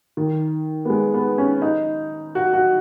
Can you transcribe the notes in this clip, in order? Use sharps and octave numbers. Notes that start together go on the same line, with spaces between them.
D#3
B3
G#3
B3
C#4
D#4
F#4
F#4